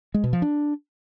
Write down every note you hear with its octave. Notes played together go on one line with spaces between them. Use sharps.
G#3
B2
F3
D4